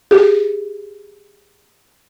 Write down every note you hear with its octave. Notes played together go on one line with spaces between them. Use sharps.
G4 G#4